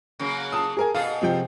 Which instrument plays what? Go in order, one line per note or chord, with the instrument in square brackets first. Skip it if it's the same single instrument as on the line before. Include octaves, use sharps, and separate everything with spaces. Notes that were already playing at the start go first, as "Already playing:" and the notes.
[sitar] C#3 F#3 A#3
[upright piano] A5 D#6
G#4 A#4 G#5
[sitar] B2 G#4 A4 [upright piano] F5
[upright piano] C3 F3 G5